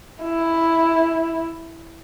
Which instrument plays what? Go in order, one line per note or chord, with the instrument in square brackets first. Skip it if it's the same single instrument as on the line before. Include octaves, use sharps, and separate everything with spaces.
[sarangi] E4